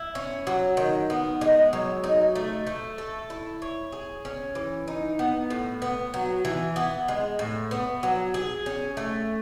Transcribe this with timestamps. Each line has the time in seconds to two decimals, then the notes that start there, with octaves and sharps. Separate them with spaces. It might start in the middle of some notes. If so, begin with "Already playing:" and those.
Already playing: E4
0.15 C#4
0.47 F#3
0.77 D#3
1.10 B3
1.41 G#3
1.73 F#3
2.04 D#4
2.35 A3
2.67 A3
2.98 A4
3.30 E4
3.62 C#5
3.92 G#4
4.25 C#4
4.55 E3
4.88 D#4
5.19 B3
5.50 A2
5.82 B3
6.14 F#3
6.45 E3
6.76 B3
7.08 G#3
7.39 A2
7.71 B3
8.03 F#3
8.34 G#4
8.66 C#4
8.97 A3